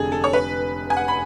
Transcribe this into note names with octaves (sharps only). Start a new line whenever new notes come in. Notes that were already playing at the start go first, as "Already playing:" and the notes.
Already playing: F1 F2 D3 G#3 G#4 A4
A4
C#5
B4
G#5
F#5
B5